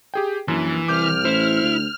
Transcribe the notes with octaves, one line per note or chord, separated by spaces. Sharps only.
G4 G#4 G5
A#1 F#2 E3
C2 D6 F6 G6
A1 E4 C5
D2